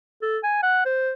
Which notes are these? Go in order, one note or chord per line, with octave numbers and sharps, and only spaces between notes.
A4
G#5
F#5
C5